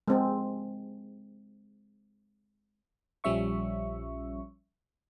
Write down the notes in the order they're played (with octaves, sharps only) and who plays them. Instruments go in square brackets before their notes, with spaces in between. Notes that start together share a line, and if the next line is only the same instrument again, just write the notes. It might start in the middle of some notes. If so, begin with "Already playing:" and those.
[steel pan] G#3 C4
[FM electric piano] A#1 F3 G3 C#4 E5 C#6